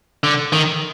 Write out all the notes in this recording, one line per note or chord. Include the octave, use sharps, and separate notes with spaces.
D3
D#3